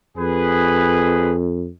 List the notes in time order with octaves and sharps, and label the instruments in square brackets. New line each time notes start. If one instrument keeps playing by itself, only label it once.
[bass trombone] F2 [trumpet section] G#4 B4